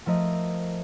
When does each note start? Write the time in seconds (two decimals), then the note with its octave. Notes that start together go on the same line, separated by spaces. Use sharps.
0.06 F3 A3 A#4 D#5